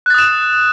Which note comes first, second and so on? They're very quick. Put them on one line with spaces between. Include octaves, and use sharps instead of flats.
F#6 A6 D#6 E7